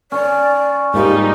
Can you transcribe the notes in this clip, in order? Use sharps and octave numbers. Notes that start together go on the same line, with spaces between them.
C#4 C#5 D5
G#2 G3 A#3 D#4 F4 G4